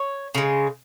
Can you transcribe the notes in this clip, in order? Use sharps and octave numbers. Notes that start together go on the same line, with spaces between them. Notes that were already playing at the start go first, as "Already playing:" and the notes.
Already playing: C#5
C#3 G#3